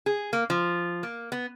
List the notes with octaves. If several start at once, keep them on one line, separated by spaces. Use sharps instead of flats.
G#4
A#3
F3
A#3
B3